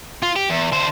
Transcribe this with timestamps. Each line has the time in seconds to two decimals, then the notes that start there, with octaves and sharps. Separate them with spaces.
0.23 F4
0.36 G4
0.50 E2
0.72 D3 C5